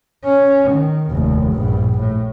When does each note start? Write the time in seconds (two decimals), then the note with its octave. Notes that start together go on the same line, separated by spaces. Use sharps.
0.24 C#4
0.71 D#3
1.11 F1 D#2
1.53 A#1 G2
2.00 A2